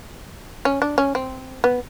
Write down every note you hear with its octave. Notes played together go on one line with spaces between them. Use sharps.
C#4
D4
C#4
C4
B3